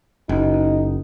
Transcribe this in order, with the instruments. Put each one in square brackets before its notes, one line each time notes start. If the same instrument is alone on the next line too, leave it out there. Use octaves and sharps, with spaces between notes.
[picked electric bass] F#1 [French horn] D#4